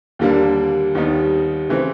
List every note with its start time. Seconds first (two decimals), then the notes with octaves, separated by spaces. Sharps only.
0.19 D#2 D3 G3 A#3 D4
0.95 D#2 D#3 G3 B3 D#4
1.69 C#3 E3 A3 C4